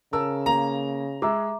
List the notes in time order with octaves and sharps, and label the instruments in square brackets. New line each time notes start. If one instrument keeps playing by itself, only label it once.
[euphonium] C#3 [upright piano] A#4 A5 E6
[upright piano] A#3 [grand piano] A#5
[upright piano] G#3 G#4 E6 [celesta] E5 A#5 D6